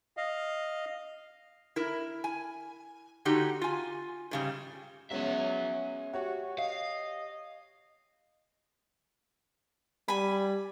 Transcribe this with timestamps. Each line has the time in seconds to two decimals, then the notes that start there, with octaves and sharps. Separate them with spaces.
0.17 D#5 F5
1.76 E4 A#4
2.24 G#5
3.25 D3 D#4 F#4 G4
3.61 F4 G#5
4.31 G#2 C#3 G3
5.11 F#3 G#3 B3 C#4 G#4 E5
6.14 F#4 G4 C#5
6.59 D#5 F5
10.08 G3 G#5 B5